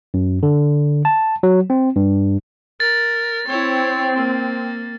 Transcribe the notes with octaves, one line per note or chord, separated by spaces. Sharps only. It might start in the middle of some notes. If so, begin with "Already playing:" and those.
F#2
D3
A5
F#3
C4
G2
A#4 A6
C4 E4 C#5
A#3